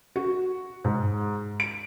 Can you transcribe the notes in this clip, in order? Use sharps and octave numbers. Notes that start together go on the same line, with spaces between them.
F#4
G#2
D7